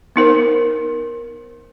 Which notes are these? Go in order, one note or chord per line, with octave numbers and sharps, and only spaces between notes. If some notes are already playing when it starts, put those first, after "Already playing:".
B3 D#4 A#4 C5